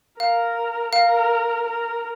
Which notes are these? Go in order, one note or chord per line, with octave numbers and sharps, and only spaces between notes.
A#4 F5
A#4 F5
A#4